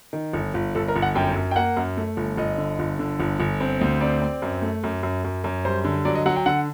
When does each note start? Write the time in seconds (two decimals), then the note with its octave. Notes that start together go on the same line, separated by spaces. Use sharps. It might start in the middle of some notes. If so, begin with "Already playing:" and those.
0.13 D#3
0.33 G1
0.54 G1
0.75 G1 A4
0.88 A#4
0.96 G1
1.02 F#5
1.15 F#2 G5
1.36 F#2
1.51 G5
1.56 A#3 F#5
1.77 F#2
1.97 A3
2.17 G1
2.37 G1 D#5
2.58 D3
2.79 G1
2.99 D3
3.20 G1
3.40 G1
3.60 C4
3.81 D2
4.01 C4 D5
4.22 C4
4.42 F#2
4.62 A3
4.84 F#2
5.03 F#2
5.24 F#2
5.44 F#2
5.65 G3 C5
5.85 D3
6.05 F#3 D5
6.15 D#5
6.26 F#3 F#5
6.36 G5
6.46 D3 F#5